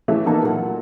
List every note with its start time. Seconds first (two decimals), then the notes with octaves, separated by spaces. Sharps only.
0.08 E3 A3 C#4 G4 E5
0.26 E3 A#3 B3 D#4 E4 A4
0.42 A#2 F#3 F#5